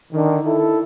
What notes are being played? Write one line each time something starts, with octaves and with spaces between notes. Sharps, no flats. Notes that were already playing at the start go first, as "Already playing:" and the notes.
D3 D#3
E4 A4